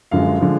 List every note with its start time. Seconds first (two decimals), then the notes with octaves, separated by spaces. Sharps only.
0.11 F#2 D3 F3 G#3 F5
0.40 D3 F3 G#3